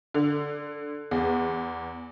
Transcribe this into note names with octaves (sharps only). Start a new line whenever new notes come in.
D3
E2